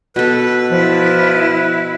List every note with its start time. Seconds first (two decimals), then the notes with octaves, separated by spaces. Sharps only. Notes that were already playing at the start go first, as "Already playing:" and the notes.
0.16 B2 A4 B4
0.71 F3 E4